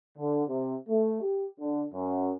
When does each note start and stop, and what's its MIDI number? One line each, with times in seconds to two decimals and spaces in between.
0.17 0.43 50
0.47 0.75 48
0.89 1.20 57
1.22 1.47 67
1.60 1.84 50
1.94 2.33 42